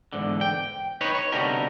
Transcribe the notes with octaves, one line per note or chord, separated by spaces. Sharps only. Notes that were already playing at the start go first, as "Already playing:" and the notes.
E2 G#2 D3
G5
D#4 B4 C#5
C#5
C2 B2 D3 D#4 G4 A#4